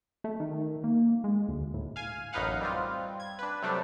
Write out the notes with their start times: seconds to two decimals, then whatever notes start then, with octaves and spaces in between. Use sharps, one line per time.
0.24 A3
0.40 D#3
0.84 A#3
1.24 G#3
1.49 D2
1.74 A2
1.96 F5 G#5
2.33 A1 F#2 D#4 B4 F5 F#5
2.61 G3 C4 F4
3.20 G#6
3.39 D4 B4
3.62 C3 F#3 G3 A3 D4